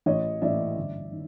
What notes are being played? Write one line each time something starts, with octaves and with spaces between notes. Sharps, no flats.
A1 C#5 D#5
A2 E3 D5 E5
G1
D#3